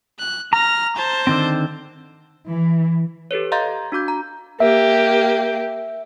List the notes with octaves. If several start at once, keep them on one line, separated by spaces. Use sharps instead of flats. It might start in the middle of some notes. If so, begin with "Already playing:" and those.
F#6
A#5 F6 A#6
C5 A5
D3 D#3 C4
E3
G4 A4 B4 C#5
D#5 F5 A#5 C6 G6 A6
D4 F#4 D6 G6
A#5
A#3 G4 E5